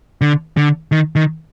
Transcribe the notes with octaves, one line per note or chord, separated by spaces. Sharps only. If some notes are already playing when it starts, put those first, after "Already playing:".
D3
D3
D#3
D#3